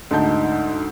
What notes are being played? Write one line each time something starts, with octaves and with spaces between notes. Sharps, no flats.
D2 G#2 A5 G6